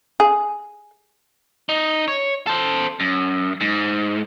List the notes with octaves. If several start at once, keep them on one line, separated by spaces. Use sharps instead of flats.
G#4
D#4
C#5
A4 C5
F#2
G#2